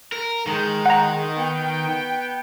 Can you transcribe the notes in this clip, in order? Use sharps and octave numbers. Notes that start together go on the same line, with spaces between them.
A#4
D#3 G#3
F#5 A#5
B3 G5